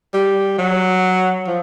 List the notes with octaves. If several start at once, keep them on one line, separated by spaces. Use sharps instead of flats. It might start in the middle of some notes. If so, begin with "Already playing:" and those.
G3
F#3
F3